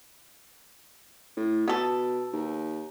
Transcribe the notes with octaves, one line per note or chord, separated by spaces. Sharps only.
A2
B2 B3 A4
D#2